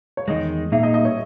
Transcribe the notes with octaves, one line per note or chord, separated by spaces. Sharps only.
C#5
E2 D#3 G#3 D#5
A#2 A#3 D#4 G#4 E5
D#5
D#5
C#5